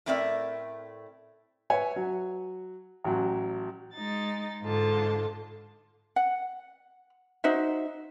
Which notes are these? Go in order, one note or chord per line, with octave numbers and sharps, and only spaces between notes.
A2 A3 C4 A#4 D5 E5
B4 C#5 E5 G#5
F#3
A1 F#3
G#3 D#4 A6
G#2 D3 F4 A5
F#5
D#4 F#4 C5 E5